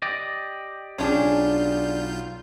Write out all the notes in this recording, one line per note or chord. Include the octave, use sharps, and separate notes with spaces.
G4 D5 D#5
B1 C#4 D4 F4 G#4 G6